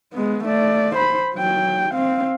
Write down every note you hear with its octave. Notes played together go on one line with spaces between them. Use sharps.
G#3 B3
A3 D5
C5 B5
F#3 G5
C4 F5